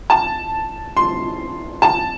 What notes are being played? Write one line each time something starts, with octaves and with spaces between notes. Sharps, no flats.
A5
C6
A5